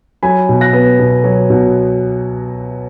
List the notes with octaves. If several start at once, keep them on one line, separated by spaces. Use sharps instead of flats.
F#3 G#5 B5
B2
F#6 A#6
B3
B2
F#3
B2